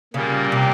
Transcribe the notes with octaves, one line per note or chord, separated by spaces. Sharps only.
A#2 C#3 G3 A#3
C3